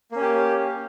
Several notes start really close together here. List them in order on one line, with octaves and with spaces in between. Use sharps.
A#3 C#4 G4